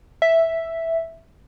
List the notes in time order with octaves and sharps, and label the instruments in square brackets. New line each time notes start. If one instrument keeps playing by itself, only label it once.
[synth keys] E5